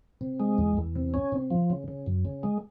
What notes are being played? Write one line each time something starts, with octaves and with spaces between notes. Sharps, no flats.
C3
G#3
E2
E2
C3
C#4
C3
F3
C#3
C#3
F#2
C#3
G#3